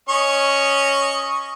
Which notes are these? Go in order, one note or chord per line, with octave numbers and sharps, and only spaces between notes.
C#4 D#5 C#6